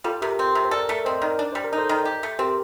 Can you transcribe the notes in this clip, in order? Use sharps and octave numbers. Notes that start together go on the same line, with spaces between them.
G3 F4 A4
C3 G4 A#4
C4
C3
C5
A4 A#4 D5
A3
C4 C5 D#5
D#3 A#4 D5
D4 D5
G3 C5
A#4
D#4
A4 C5
D#3
G4
A3
C4 G4 A#4